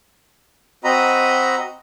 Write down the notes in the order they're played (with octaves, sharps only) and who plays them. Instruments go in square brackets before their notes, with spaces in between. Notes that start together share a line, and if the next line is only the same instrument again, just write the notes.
[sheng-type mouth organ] C4 F#4 D#5 A#5 B5